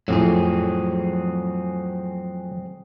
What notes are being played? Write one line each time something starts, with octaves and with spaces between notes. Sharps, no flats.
F2 A2 F#3 C4 G#4